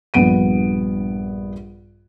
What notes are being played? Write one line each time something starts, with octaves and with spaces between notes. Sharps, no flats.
A#1 G2 B3 D7 D#7